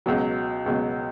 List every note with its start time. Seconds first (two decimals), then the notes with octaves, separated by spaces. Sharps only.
0.06 C#2 B2 F#3
0.66 C#2 B2 F#3